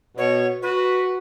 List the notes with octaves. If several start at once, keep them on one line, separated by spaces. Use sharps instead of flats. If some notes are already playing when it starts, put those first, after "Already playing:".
B2 C#5
F#4 B4